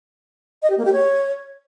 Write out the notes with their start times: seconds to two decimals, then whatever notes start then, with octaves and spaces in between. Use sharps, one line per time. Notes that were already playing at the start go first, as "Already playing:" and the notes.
0.62 D#5
0.70 G4
0.78 A#3
0.85 G4
0.93 C#5